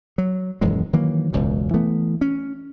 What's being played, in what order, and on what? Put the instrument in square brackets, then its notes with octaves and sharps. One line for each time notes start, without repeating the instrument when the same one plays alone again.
[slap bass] F#3
D#1 F#2 E3 G#3
D#3 E3 F#3 A#3
E1 C#2 F#2 B2
E3 A3 B3
C#4